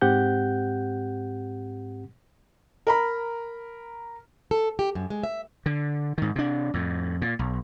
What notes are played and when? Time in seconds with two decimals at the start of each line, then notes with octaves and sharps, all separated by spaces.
0.01 G#2 C4 G4 F#5 G6
2.87 A#4 A#5 B5
4.51 A4
4.79 G4
4.95 F#2
5.10 G#3
5.24 E5
5.66 D3
6.18 G#2 D#3
6.36 C3 D4
6.74 F2 A2
7.22 A#2
7.39 B1